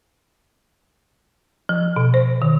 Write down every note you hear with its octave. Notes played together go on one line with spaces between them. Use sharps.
F3
B2
C5
D#3